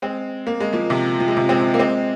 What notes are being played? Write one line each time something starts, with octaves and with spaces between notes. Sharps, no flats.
G#3 C4
A#3
G#3
F3 A#3
C3 F3
F3
G#3
C3 F3
G#3 C4
A#3
G#3 C4